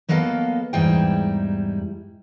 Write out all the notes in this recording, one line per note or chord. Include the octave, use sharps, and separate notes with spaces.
F#3 A#3 B3 A4 D#5 F5
E2 G#2 G3 D#4 E4 G5